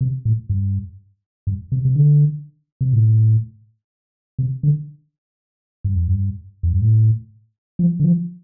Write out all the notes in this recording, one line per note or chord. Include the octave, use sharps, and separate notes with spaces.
C3
A2
G2
G2
C3
C3
D3
C3
A2
C3
D3
G2
F2
G2
F2
G2
A2
F3
D3
F3